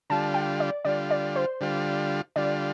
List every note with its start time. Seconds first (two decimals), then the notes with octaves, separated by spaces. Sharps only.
0.10 D3 G3 F4 A5
0.34 G5
0.60 D5
0.85 D3 G3 F4 D5
1.11 D5
1.36 C5
1.61 D3 G3 F4
2.36 D3 G3 F4 D5